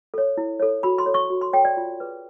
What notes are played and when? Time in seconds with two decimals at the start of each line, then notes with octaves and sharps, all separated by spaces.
0.14 A4 C#5
0.38 E4
0.60 A4 C#5
0.83 F#4 B5
0.98 C6
1.06 A4 C#5
1.14 C#6
1.30 F#4
1.41 C6
1.53 A4 C#5 G5
1.65 D5
1.77 F4
2.00 G#4 B4